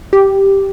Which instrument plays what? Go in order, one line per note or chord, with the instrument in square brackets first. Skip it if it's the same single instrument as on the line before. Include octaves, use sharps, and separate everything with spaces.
[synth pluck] G4